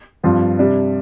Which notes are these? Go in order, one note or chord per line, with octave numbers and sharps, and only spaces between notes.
G2 F3 C4 F4
C3 G3 D4